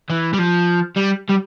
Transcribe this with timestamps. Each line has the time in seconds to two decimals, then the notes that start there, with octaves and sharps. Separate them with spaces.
0.10 E3
0.33 G3
0.39 F3
0.97 G3
1.30 G3